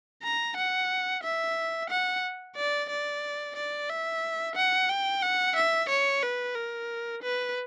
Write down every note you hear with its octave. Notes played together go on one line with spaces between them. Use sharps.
A#5
F#5
E5
F#5
D5
D5
D5
E5
F#5
G5
F#5
E5
C#5
B4
A#4
B4